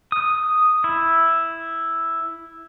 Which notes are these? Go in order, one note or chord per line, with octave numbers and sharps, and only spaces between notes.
D#6
E4